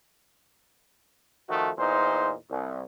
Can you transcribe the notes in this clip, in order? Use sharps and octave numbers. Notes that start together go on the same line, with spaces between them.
D#3 F3 A3 F#4
E2 A#2 D#4 C5
C2